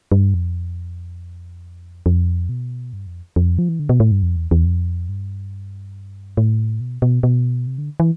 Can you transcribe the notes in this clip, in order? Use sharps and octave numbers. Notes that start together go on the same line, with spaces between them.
G2
F2
F2
B2
G2
F2
F2
F3
E3
D3
B2
A2
G2
F2
E2
E2
F2
G2
A2
B2
B2
B2
C3
D3
E3